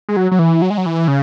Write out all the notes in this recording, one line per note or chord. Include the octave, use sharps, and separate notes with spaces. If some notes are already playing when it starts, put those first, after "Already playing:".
G#3
F#3
F#3
E3
F#3
G#3
F#3
E3
C#3